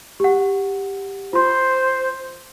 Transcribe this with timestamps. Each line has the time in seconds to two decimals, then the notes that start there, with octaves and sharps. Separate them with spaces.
0.20 G4 F#5
1.33 F4 C5 C6